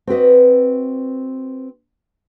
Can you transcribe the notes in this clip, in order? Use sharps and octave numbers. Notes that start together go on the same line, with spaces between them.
C4 F#4 B4 D#5